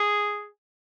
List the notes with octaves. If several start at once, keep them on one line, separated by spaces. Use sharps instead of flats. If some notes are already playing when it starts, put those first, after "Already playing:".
Already playing: G#4